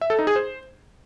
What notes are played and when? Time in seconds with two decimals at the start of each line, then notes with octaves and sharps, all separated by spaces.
0.01 E5
0.10 A4
0.19 D#4
0.27 G#4
0.36 C5